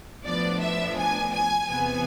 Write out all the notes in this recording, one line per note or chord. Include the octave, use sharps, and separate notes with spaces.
A2 F3 B3 D4 D5
E5
G#5
G#5
E2 C3 E3 B3 G#5